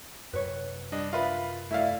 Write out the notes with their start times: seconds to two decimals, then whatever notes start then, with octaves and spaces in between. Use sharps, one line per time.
0.33 F#2 C3 B4 C#5
0.92 G3 D4 D#5
1.13 F4 A#4 B4 E5 B5
1.71 A3 E4 D5 E5 F5